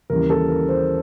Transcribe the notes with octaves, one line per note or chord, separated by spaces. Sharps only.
D#2 C#3 E3 G3 A#4
A4
A#4
C5